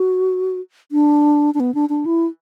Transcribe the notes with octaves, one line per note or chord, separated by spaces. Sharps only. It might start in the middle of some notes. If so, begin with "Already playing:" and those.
Already playing: F#4
D4
D4
B3
D4
D4
E4